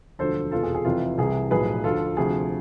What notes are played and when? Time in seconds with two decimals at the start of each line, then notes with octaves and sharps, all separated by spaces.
0.19 E1 D2 D3 F3 A4 C5
0.52 F1 E2 B2 F4 A4
0.63 G#4
0.74 G#4
0.85 F1 F2 C3 E3 F4
1.18 C2 C3 E3 G#4
1.51 B1 A2 F3 G#4 B4
1.84 D2 D3 F3 F4 A4
2.17 D2 C3 F3 G#4